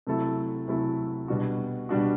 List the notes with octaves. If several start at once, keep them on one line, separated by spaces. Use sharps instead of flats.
C3 F#3 A3 E4 A4
C3 F#3 A3 E4 A4
B2 G3 D4 F#4
B2 G3 D4 F#4